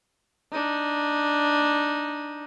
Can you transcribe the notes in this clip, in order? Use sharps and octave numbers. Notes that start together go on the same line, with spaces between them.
D4 D#4